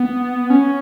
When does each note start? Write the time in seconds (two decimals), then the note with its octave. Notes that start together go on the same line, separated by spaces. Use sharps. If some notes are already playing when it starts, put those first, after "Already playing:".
Already playing: B3
0.50 C#4